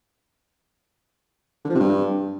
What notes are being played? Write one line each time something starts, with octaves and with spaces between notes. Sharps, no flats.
D3
F3
C3
G2